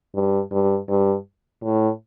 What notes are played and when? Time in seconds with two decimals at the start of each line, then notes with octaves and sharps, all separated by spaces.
0.15 G2
0.51 G2
0.89 G2
1.63 A2